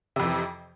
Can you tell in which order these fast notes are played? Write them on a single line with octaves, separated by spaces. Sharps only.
C3 F2 E3